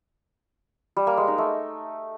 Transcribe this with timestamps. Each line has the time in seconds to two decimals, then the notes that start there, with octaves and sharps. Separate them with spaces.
0.97 G3
1.07 A#3
1.17 G#3
1.28 D#4
1.38 A3